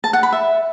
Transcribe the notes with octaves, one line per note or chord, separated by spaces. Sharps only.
A5
F#5
B5
E5